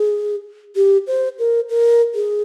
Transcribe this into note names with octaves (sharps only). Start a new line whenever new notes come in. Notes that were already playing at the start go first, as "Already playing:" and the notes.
Already playing: G#4
G4
C5
A#4
A#4
G#4